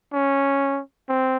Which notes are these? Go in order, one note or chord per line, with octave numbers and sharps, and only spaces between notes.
C#4
C4